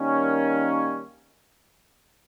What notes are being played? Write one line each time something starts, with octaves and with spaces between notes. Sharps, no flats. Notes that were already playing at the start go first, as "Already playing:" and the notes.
Already playing: D#3 G3 A#3 C#4